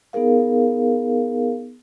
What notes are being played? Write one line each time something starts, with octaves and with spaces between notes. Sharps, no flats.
B3 D#4 G#4 A#4 F5